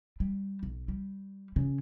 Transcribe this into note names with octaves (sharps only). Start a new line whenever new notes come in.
G3
B1
G3
C#3